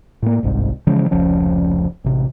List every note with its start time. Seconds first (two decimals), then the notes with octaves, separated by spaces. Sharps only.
0.22 A2 A#3
0.43 G1 C2 G#2
0.87 C#3 E3 F3 G#3
1.11 F1 C#2 F3 C#4
2.04 A1 C3